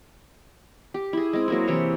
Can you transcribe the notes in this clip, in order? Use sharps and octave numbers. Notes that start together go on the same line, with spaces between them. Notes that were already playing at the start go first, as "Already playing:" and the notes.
G4
E4 G#4
G#3 C4
F#3 A#3 E4
C3 E3 C5 C#5